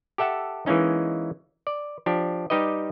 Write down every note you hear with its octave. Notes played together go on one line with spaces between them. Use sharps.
G4 A4 E5 F#5 A5
E3 G#3 A#3 C#4 D#4
D5
F3 D4 G4
G3 D#4 G4 B4 D#5